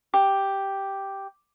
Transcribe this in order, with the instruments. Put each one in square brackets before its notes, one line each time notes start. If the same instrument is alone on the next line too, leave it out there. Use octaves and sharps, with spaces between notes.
[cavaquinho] G4